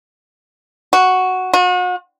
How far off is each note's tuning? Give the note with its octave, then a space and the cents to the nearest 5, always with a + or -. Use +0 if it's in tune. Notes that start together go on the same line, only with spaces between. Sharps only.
F#4 +0
F#4 -40